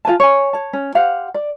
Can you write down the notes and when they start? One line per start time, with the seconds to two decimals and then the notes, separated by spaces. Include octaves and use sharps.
0.05 F4 B4 G#5 A5
0.20 C#5 G#5
0.53 C#5 A5
0.73 C#4
0.95 G4 C5 F5 F#5
1.34 D5